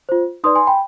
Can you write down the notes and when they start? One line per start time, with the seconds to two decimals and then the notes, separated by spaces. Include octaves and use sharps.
0.09 F4 C5
0.44 D#4 B4 D5 C6 D#6
0.55 G#5 C6
0.67 G5 B5